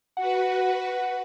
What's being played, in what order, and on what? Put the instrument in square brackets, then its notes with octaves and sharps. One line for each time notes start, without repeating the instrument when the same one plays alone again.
[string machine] F#4 B4 [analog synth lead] F#5